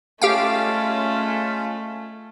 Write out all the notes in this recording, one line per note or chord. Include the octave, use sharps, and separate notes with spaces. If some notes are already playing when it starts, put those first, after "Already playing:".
G#3 A3 C#4 F4 G4 F5 G5